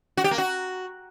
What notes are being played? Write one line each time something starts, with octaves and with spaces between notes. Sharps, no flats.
F#4
G4
A#3
F#4